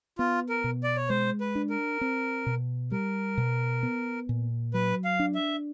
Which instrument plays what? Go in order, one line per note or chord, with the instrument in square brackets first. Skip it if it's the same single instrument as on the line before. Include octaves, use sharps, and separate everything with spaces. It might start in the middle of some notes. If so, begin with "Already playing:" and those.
[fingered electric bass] B3 [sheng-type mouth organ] F4
[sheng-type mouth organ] A#4
[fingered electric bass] B2
[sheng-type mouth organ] D5
C#5
[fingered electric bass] G#3 [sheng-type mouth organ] C5
[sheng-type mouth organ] B4
[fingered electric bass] D4
[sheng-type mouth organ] A#4
[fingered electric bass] C4
B2
[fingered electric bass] G3 [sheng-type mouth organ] A#4
[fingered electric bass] B2
B3
A#2
[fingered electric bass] F#3 [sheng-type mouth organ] B4
[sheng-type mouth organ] F5
[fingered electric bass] D4
[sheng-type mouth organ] E5